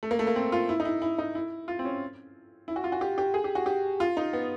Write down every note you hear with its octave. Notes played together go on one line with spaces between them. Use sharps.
A3
A#3
A3
A#3
C4
F4
E4
D#4
E4
E4
D#4
E4
F4
C4
C#4
E4
F#4
F4
F#4
G4
G4
G#4
G4
F#4
G4
F4
D#4
B3